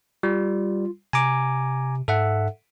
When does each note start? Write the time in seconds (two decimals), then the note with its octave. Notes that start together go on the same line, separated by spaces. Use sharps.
0.23 G3 F4
1.13 C3 G#5 A#5 D6
2.08 G#2 A4 E5 F#5